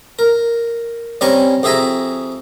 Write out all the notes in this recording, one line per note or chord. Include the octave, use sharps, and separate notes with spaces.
A#4
G3 C4 C#4 G#5 A#5 C#6
F2 G4 G#4 E5 G#5 A#5